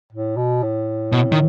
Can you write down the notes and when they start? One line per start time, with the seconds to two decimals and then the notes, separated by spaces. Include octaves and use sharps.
0.13 A2
0.37 B2
0.63 A2
1.12 B2
1.32 D#3